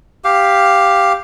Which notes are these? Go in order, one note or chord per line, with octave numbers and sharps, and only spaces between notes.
G4 F5